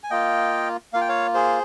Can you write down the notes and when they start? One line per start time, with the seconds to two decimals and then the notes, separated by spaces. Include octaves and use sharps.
0.04 G#5
0.10 A#3 F4 D#5 G5
0.93 A#3 F4 F5
1.01 G5
1.09 C#5 F5
1.34 G#4 C5